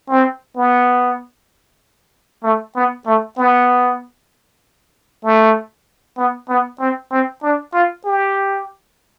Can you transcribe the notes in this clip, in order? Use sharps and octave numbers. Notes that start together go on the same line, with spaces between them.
C4
B3
A3
B3
A3
B3
A3
B3
B3
C4
C4
D4
F4
G4